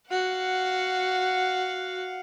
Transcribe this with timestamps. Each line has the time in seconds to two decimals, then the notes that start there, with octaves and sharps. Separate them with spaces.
0.11 F#4 F5 F#5